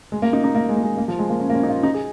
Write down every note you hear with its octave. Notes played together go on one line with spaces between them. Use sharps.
G#3
A#3
D#4
D#4
A#3
G#3
A#3
G#3
A#3
F3
G#3
A#3
C#4
A#3
C#4
D#4
F4
D#4
G#4